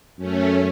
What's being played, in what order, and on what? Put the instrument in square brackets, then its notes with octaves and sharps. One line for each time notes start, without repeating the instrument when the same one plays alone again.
[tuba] F#2 [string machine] A3 C#4